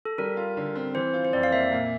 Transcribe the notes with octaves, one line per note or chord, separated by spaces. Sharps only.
A4
G3 A#4
F4
D3
C4
E3 C5
F4
C5
F2 D5
F5
A#3 E5
A#2